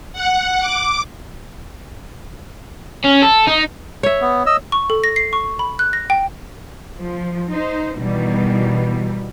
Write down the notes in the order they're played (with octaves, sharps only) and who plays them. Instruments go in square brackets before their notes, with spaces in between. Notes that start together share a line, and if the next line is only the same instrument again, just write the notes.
[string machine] F#5
D6
[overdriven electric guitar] C#4
A4
D#4
[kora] C#5 E5
[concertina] B3
D#5 E6
[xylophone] C#6
A4
A#6
C7
C#6
B5
F#6
A#6
G5
[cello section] F3
D#4 C5
B2 D#3 E3 G3